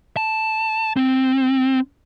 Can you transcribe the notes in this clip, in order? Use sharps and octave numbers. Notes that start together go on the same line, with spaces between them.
A5
C4